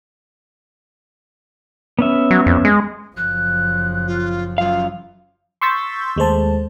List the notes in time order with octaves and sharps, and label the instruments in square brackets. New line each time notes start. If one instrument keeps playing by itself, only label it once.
[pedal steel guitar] B3 C#4 E5
[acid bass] F#3
F2
G#3
[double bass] F#1 F3 [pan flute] F#6
[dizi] F4
[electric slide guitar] F#2 F5 [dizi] F4
[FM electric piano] C6 C#6 E6 G6 A6 B6
D#2 G#3 A3 C5 A5